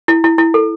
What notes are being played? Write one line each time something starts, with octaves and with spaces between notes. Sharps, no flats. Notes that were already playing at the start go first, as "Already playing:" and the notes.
E4
E4
E4
A4